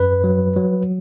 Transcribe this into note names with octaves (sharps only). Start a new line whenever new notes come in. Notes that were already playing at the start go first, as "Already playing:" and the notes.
Already playing: F#2 B4
F#3
F#3